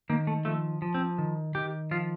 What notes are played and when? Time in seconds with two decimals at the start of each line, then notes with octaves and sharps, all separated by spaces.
0.09 D#3 A#3
0.27 A3
0.45 F3 A3
0.82 F3
0.94 C4
1.18 D#3
1.55 D#3 G4
1.91 F3 F4